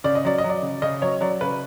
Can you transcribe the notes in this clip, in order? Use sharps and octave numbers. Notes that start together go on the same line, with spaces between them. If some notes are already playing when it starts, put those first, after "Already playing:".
C#3 D5
D#5
F#3 D5
D#5
F#3
D5
C#3
C#3 D#5
F#3 C#5
F#3 D5
C#3 B4